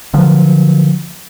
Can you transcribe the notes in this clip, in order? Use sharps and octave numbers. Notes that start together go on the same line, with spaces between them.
D3 F3 F#3